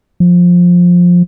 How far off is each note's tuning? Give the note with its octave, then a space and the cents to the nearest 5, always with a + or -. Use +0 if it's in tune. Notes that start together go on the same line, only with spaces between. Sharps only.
F3 +15